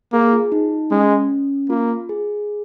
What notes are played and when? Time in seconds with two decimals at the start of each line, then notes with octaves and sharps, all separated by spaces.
0.12 A#3 G#4
0.28 G#4
0.33 F4
0.52 D#4
0.91 G#3 C#4
1.69 A#3 F4
2.09 G#4